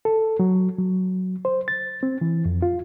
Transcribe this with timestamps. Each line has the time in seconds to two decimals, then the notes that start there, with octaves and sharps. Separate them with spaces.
0.05 A4
0.39 F#3
0.78 F#3
1.45 C5
1.68 A6
2.03 C4
2.21 E3
2.45 F2
2.62 F4